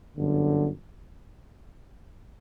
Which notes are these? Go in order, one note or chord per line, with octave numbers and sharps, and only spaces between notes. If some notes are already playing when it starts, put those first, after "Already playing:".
G1 F#2 D3